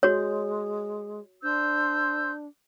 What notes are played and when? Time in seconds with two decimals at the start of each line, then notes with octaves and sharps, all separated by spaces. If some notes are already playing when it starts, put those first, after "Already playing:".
0.03 G#3 F#4 C#5
1.43 D4 C5 E6 G6